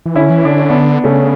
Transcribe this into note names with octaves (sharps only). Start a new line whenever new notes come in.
E3
D3 C#4 E4
E3
D3 D4
C#4
B3 D4
C#3 A3 C#4